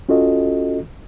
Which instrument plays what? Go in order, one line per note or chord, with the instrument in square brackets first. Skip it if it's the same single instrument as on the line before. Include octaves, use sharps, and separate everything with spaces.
[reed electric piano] C#4 F4 F#4 A4 D#5